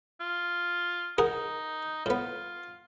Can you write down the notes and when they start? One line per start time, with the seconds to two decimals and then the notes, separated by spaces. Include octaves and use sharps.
0.21 F4
1.18 D#4 G#4 A#4 F#5
2.06 A2 B3 F4